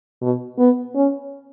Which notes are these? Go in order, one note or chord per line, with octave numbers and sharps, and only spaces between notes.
B2
B3
C#4